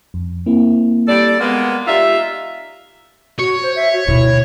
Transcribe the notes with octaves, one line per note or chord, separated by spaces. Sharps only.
F2
A#3 C4 E4
G3 A4 D5
G#3 A#3 B3
D#4 F4 G4 D5 E5 E6
F#4 C#5
C5
E5
F#4
D2 B2 E4